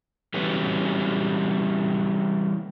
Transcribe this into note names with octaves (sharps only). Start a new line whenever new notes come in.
E3 G3 B3 C#4 F#4